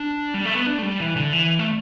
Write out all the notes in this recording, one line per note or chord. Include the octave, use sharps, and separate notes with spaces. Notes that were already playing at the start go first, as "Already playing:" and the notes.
Already playing: D4
G3
A3
B3
D4
A3
G3
E3
D3
E3
A3